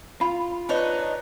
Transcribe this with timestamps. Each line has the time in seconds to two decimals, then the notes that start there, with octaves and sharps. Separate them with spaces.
0.21 F4 B5
0.69 D4 D#4 B4 C#5